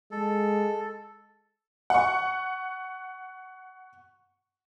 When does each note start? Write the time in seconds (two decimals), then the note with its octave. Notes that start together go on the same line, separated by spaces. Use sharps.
0.11 G#3 A4
1.90 F#5 C#6